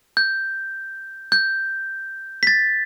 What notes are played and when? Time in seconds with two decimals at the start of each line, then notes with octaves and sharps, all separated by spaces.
0.17 G6
1.32 G6
2.43 B6
2.47 A6